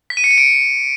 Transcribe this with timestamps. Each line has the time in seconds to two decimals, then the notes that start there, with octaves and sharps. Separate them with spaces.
0.10 B6
0.17 D#7
0.24 C#7
0.31 D#7
0.38 D7